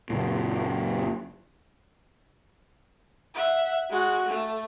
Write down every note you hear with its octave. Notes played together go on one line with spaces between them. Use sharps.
F#1 A#2
E5 F#5
G#3 F#4
A3